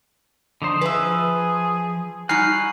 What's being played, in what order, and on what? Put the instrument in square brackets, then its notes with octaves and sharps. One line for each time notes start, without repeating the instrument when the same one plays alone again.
[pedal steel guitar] D3 F3 C5 [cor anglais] D#4
[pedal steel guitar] F3 [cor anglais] G#4 [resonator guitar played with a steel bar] B4 E5
[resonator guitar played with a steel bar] G3 D#4 [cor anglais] F#4 [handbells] G#5 F6 C7 [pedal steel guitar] F#6